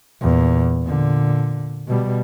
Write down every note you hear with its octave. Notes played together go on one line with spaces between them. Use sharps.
E2 A#2
A#2 D3
B2 G3